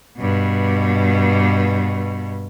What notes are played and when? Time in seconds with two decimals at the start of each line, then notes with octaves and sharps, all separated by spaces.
0.18 G2 B2